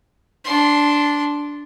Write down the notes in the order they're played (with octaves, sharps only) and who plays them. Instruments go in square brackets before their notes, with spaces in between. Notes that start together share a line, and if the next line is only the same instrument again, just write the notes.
[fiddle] D4 C6